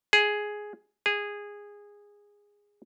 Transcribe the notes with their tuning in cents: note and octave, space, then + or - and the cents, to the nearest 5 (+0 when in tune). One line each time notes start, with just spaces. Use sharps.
G#4 +5
G#4 -15